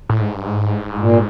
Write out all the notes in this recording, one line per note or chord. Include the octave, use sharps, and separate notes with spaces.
A2
G#2
G2
G#2
A#2